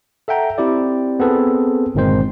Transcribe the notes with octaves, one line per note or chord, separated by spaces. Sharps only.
A4 E5 F#5 G5 A#5
C4 E4 G4 D5
B3 C4 G#4 A4 B4
G1 A#2 D#3 G#3 C4 C5